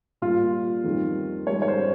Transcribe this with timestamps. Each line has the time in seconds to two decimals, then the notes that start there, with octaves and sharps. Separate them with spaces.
0.22 A#2 G3 F4
0.84 F2 D#3 G3
1.47 G#2 G3 C#5
1.62 C#5
1.68 C5